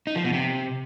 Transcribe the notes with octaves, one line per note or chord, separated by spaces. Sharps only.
D#4
F3
B2
C3